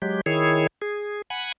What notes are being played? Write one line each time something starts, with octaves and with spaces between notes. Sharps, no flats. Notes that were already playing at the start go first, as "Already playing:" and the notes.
F#3 G#3 G4
D#3 E4 G#4 C#5
G#4
F#5 G#5 B5